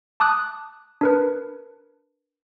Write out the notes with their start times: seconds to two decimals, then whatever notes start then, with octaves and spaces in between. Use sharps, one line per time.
0.20 A5 D6 D#6 F#6
1.01 D4 A#4 B4